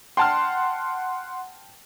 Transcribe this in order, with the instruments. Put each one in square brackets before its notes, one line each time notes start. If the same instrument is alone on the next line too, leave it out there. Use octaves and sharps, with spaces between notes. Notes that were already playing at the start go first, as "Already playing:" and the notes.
[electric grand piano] F#5 C6 [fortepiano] G5 A5 F6